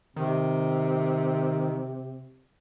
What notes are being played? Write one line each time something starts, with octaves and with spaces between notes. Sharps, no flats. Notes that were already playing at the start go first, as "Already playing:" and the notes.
C3 D#3